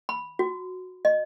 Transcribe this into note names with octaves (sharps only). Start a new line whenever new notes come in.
B5
F#4
D#5